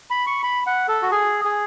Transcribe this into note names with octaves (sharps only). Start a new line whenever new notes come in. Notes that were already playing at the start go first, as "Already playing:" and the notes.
B5
C#6
B5
F#5
A4
F#4
G#4
G#4